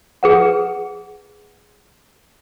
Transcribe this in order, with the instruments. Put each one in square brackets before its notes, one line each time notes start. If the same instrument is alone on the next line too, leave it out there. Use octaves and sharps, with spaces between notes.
[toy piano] G#4 B4 F#5